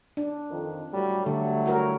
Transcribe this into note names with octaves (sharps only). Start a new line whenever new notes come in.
D4
F2 D#3
A2 F#3 G3
D3 F#3 G3 A3
E4 F#4 A#4